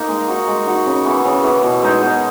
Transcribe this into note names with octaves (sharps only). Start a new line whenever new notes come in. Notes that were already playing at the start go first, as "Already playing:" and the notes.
Already playing: A#3 D#4
G#3
D#4 F#4
G#3
D#4 F#4
C#3
E3 B3
C#3
E3 B3
B2
G#3 D#4
B2